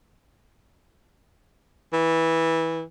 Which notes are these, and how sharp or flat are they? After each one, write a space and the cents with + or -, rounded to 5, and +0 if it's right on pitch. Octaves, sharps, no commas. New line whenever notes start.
E3 -15